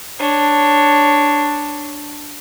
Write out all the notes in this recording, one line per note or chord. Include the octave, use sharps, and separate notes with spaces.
D4 C#5